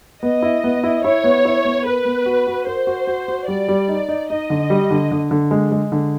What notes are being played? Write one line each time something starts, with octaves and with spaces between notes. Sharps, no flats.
B3 D#5
E4
B3
E4
E4 C#5
B3
E4
B3
A#4 B4
B3
F#4
F#4
A#4 C5
F#4
F#4
F#4
G3 D5
G3
D#4
D#4
D#4 D#5
D3
G3
D3
D3
D3
G#3
G#3
D3